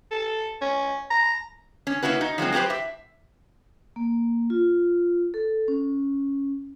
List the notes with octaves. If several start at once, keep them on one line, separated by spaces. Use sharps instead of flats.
A4
C#4
A#5
C#4
A#3 C#4 E4 F#4 B4
D#4
F3 F#3 G#3 C4
F#3 A3 G4 B4 C5
E5
A#3
F4
A4
C#4